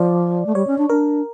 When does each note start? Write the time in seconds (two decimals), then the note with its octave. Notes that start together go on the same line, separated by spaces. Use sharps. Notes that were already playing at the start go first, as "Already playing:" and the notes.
Already playing: F3 D5
0.46 A3
0.55 G3 C#5
0.67 C#4
0.78 D4
0.89 D4 A#4